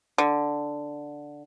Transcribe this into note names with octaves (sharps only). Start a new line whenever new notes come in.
D3